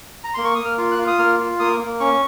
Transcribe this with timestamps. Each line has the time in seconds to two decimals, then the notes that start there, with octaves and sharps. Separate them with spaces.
0.24 A#5
0.34 A#3 C6
0.44 C#6
0.55 A#3 D#6
0.65 F6
0.78 F4
0.92 F#6
0.99 F4
1.07 D#6
1.19 A#3 F6
1.39 F4
1.59 A#3 D#6
1.80 A#3
2.00 C#4 C#6